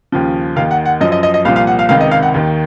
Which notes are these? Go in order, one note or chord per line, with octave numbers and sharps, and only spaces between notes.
D#2 C#3 F3
D#2 D#3 F5
F#5
F#5
F#2 F3 D#5
D#5
D#5
D#5
C2 A#2 F3 F5
F5
F#5
F5
C#2 C3 D#3 F5
D#5
F5
F#5
D#2 D#3